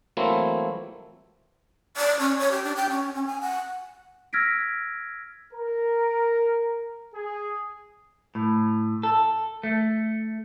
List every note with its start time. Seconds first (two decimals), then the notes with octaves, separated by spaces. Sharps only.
0.17 E3 F#3 A3 A#3 C4 E4
1.97 D5
2.19 C#4
2.39 C#5
2.51 G4
2.64 D4
2.77 G5
2.90 C#4
3.14 C#4
3.27 G#5
3.41 F#5
4.33 E6 F6 G#6 A#6 B6 D7
5.52 A#4
7.14 G#4
8.35 A2
9.03 A4
9.63 A3